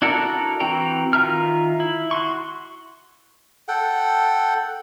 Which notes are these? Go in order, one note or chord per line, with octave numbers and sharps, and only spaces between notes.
D4 E4 F#4 A4 A#4
E3 C4 F#4 G5 A#5
D#3 F4 E5 A#5 F6
E4
F#4 C6 C#6
A4 F#5 G5